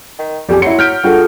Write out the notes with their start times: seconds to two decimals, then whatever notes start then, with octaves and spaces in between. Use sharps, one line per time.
0.19 D#3
0.49 B1 F2 G3 G4 G#4
0.62 F#3 E4 C6 C#7
0.79 F6 G6 B6 D7
1.04 G2 D4 F4 F#4 G#4 A4 G5